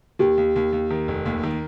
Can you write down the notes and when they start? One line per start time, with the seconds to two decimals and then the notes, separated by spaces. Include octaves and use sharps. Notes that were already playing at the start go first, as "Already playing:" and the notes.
0.19 D#2 G4
0.37 D#2
0.56 D#2
0.73 D#2
0.90 D#3
1.08 F1
1.26 D#2
1.43 D#3